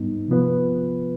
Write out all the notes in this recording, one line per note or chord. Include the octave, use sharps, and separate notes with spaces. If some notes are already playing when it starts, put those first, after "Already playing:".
Already playing: G#2 G3 B3 D#4
C3 F3 B3 F4 B4